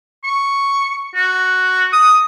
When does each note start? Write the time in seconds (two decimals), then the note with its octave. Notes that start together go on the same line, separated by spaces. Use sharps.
0.24 C#6
1.15 F#4
1.93 D#6